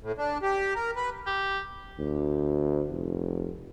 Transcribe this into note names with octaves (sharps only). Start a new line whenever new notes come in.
A2
D4
G4
A#4
B4
G4
D2
F1